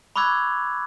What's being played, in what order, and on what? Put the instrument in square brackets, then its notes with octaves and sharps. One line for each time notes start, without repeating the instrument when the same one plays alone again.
[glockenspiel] B5 C#6 D6 E6 F#6 G#6